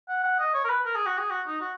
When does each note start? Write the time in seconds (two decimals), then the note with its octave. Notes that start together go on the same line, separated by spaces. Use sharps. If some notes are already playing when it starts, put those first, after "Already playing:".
0.09 F#5
0.24 F#5
0.39 D#5
0.54 C#5
0.64 A#4
0.69 B4
0.85 A#4
0.95 G#4
1.06 F#4
1.18 G#4
1.30 F#4
1.47 D#4
1.61 F#4